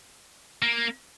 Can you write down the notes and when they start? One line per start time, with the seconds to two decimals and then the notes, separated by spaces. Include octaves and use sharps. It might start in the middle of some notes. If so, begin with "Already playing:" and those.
0.62 A#3